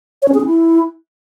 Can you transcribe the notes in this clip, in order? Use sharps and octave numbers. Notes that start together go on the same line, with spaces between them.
C#5
C#4
G#4
C#4
E4